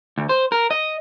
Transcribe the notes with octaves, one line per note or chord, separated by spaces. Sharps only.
D2
C5
A#4
D#5